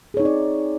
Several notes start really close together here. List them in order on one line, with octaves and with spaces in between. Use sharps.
G#4 C#5 D#4 C4 D5